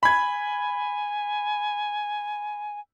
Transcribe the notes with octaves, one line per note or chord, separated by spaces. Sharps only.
G#5 B5 G#6